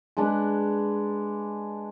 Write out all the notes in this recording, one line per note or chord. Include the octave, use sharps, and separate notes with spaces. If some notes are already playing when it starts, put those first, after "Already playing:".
G#3 D4 B4